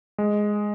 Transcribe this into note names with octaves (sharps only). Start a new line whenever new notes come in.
G#3